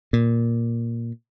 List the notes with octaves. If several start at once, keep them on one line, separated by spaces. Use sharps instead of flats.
A#2